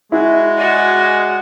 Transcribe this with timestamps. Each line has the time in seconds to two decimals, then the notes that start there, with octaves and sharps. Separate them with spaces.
0.12 G#3 E4 F#4 G#4
0.58 F#4 D5 D#5 G#5